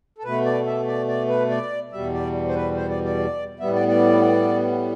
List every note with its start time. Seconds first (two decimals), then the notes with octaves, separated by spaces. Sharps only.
0.18 A4
0.24 B2 A3 B4
0.45 D5
0.66 E5
0.88 D5
1.08 D5
1.29 B4
1.50 D5
1.92 E2 B2 G3 E5
2.14 D5
2.48 C5
2.55 B4
2.77 C5
2.90 D5
3.05 D5
3.59 A2 G3 B3 E5
3.75 D5
3.88 D5